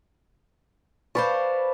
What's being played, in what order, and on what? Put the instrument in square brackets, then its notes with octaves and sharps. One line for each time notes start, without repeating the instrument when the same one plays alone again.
[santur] B4 D5 C#6 [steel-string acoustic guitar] C5 F5 A5